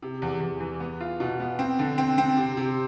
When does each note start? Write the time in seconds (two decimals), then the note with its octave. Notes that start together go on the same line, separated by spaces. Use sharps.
0.02 C3
0.22 E2
0.40 E2
0.60 E3
0.80 B3
1.01 F4
1.20 B2
1.40 B3
1.59 C4
1.79 D3
1.98 C4
2.18 C4
2.37 C3
2.57 C3